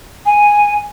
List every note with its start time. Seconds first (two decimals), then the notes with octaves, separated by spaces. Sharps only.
0.26 G#5